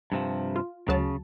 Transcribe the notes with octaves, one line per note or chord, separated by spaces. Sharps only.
G2 C3 F3
F4
D2 C#3 F#3 A5